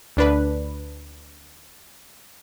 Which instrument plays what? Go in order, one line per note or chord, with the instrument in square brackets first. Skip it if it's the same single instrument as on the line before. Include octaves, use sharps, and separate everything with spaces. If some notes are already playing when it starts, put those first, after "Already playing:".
[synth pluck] D2 D4 B4